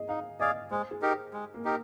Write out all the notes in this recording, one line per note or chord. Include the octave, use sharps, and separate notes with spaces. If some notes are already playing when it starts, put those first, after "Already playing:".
Already playing: G#4 D#5
D#4 F5
G#4 D5 D#5 F5
G#3 C5
G#4
D#4 G4 A#4
G#3
A#3
D#4 G4 A#4